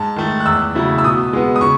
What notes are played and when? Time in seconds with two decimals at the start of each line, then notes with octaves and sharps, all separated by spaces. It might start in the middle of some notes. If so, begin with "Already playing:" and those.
Already playing: G#2 A5
0.16 D#3 A3
0.40 F#6
0.46 E2 E6
0.75 C#3 F#3 A3 E4
0.98 E6
1.04 B2 D#6
1.33 G#3 B3
1.56 D#6
1.61 C#3 C#6